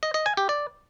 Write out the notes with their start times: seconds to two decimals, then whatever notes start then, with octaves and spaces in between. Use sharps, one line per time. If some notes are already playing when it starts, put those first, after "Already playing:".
0.03 D#5
0.14 D#5
0.26 G#5
0.37 G4
0.49 D5